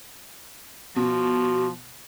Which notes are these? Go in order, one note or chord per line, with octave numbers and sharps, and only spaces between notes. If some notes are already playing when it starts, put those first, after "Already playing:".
B2 F3 F#4